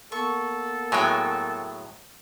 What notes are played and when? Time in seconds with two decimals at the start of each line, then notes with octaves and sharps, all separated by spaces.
0.12 A#3 B3 A4 C#6
0.92 A2 F#3 G#3 G5 G#5